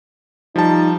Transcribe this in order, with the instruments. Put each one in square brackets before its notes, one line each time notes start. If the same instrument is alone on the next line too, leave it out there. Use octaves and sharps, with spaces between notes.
[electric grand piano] F3 G3 A5 [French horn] D#4